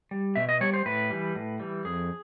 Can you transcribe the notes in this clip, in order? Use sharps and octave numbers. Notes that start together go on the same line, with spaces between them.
G3
B2 E5
D#5
G3 C#5
C5
A2 B4
E3 G3
A2
E3 G3
F2 G#4